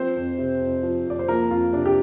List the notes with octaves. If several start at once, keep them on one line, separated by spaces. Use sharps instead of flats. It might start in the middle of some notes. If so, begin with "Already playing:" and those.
Already playing: F3 C4 C5
F2
C3
F2
F3
F2 D5
C5
F3 A#3 A#4
F2 F4
C3 D4
G4